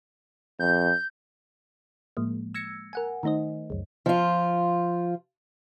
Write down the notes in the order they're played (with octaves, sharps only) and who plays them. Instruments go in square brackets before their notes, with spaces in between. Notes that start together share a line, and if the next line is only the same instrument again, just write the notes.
[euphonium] F2 [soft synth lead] G6
[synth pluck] A2 F3 G#3 A#3
E6 G#6 A#6 C#7
A#4 F#5 G#5
D#3 A3 D#4 C5 D#5
C#2 F#2
[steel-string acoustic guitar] F3 F4